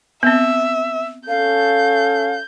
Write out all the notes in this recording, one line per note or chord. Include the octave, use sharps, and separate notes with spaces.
B3 C4 E5
C#4 A4 F5 G6